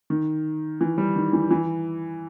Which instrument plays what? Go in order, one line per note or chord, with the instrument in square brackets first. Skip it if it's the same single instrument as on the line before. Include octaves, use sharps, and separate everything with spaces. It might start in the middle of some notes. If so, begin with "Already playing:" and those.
[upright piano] D#3
E3
G3
D#3
E3
E3